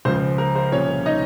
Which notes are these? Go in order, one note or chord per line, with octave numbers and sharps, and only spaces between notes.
C#2 C#3 F3 C5
A#4
C5
C2 A#2 F3 C#4 C#5
D#4 D#5